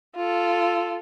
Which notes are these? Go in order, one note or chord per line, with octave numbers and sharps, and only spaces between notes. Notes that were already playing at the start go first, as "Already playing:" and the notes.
F4 A4